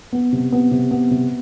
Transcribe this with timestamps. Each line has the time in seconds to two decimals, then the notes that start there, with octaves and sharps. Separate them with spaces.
0.13 B3
0.33 C3
0.52 B3
0.71 C3
0.91 B3
1.11 C3